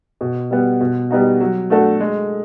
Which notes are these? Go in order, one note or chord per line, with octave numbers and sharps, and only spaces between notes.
B2
G3 B3
B2
G3 B3 D#4 F#4
F#3
A3 D4 F#4 A4
G#3